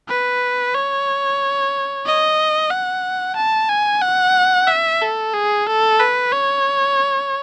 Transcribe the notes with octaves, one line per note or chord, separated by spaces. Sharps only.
B4
C#5
D#5
F#5
A5
G#5
F#5
E5
A4
G#4
A4
B4
C#5